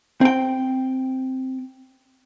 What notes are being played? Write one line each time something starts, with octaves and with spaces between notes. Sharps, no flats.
C4 G5